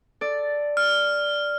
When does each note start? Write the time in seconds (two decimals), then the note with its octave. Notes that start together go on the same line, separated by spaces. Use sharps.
0.21 A4 D5
0.77 F6